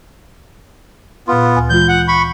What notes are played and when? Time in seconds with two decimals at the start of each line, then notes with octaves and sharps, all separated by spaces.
1.28 A#2 B3 F4 C6
1.56 D2 G#5
1.70 E3 G#3 F4 G6
1.88 F#5
2.08 B5 C#6